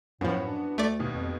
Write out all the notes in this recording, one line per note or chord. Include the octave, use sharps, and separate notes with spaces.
F#2 A2 F3 B3 E4 F#4
D4
D2 A3 D5
D#2 B2
F2